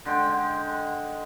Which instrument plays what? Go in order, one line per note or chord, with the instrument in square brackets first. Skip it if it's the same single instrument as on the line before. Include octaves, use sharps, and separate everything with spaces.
[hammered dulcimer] D3 G#3 G5